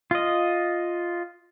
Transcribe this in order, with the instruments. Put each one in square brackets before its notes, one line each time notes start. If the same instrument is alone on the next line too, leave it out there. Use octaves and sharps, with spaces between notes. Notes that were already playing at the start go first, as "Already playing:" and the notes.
[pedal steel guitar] F4 D#5